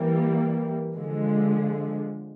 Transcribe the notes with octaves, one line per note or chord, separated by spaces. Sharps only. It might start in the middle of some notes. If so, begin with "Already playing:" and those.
Already playing: E3 G3 A#3
D3 F3 G#3